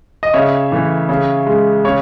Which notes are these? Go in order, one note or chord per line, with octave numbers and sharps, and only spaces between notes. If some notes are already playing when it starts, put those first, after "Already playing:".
D#5
C#3 C#5 E5
E3 A3
C#3
G#3
C#3 C#5